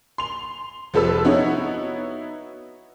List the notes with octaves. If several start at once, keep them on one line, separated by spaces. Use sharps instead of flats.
C6 F7
F1 F3 A4 B4 E6
B3 D#4 E4 F#4 C#5